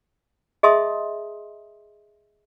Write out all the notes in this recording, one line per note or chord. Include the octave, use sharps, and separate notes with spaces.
G#4 D#5 E5 A5 C6 D#6